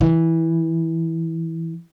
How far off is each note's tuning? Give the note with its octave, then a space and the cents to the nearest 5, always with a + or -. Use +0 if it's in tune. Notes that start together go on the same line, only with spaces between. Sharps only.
E3 -10